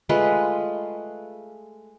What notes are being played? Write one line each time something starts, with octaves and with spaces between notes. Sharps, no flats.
G#3 A3 F4 B4